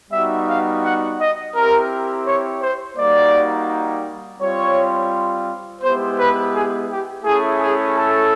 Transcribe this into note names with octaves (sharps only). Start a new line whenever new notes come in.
G3 B3 D#4 F#4 E5
F5
F#5
D#5
C4 E4 G4 A#4
C#5
C5
G3 A#3 D#4 F#4 D5
G3 C4 F4 C#5
G#3 B3 E4 G4 C5
B4
G#4
G4
A3 C#4 E4 G#4
G#4
A4